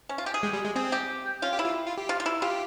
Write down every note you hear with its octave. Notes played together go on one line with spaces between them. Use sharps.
C#4
F4
G4
G#4
G#3
G3
G#3
C4 G#4
G4
C#4 F4
G4
E4
F4
F4
G4
F4
F4
E4
F4 G4